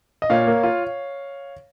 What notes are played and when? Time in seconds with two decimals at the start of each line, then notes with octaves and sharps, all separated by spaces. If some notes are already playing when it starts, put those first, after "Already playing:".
0.22 D#5
0.30 A#2 C#5 F5
0.47 A#3
0.63 F4